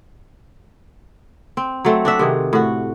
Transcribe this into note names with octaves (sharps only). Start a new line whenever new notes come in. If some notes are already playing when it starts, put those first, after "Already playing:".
C4
F#3 A3 C4
D4 F#4 E5
C3 D#3 G#4
A2 F#4